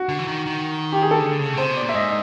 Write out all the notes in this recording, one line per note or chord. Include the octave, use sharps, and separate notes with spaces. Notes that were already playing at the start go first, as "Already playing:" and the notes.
Already playing: F#4
D3
E3
D#3
D#3
G4
G#4
A4
D3
C#3
B2
C3 C5
B2
D5
A#2
E5
G#2 D#5